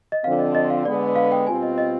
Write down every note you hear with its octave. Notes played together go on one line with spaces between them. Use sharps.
D#5
D3 F3 C4 F5
D#5
D#5
F5
D3 G#3 B3 D5
F5
G5
B2 G3 C4 F4 G#5
D#5
D#5